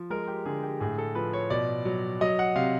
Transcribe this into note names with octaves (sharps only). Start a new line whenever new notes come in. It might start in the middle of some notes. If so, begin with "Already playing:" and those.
Already playing: F3
G#3 A#4
G4
D3 G#4
G4
A2 G#4
A4
F3 B4
C#5
B2 D5
F#3
F#3 D#5
F#5
C3 F5